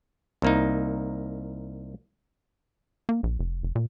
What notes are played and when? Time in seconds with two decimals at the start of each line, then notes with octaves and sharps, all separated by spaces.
0.42 C2 A#3 D#4
3.09 A#3
3.23 A#1
3.39 F1
3.63 F1
3.75 A#2